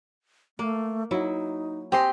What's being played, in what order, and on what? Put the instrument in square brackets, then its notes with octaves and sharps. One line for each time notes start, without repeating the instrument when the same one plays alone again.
[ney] A3 [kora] A#3
[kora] F#3 E4 [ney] D#4
[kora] C4 D#5 [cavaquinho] G4 C6 [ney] G#5